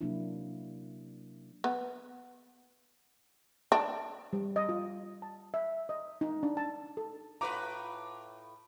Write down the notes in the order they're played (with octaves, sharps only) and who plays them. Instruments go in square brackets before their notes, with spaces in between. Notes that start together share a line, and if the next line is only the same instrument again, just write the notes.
[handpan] C3 F#3 A#3 D4 E4
[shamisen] B3
D4
[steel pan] G3
D#5
F4
A5
E5
D#5
D#4
D4
A5
A4
[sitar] A2 F4 B4 [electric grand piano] A#5 D6